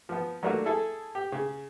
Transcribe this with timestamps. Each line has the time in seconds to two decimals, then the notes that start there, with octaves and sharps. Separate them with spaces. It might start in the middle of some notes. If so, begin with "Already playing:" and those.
0.09 F3 B3
0.43 F#3 G3 A3 A#3 D4 F#4
0.65 E4 G#4 A4
1.15 G4
1.32 C#3